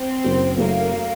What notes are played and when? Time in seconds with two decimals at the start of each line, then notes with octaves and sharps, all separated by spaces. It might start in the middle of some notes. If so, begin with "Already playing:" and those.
Already playing: C4
0.24 F#1 F#2 F#3
0.58 F#1 F#2 F#3 A3 A#3
0.93 F#3 A3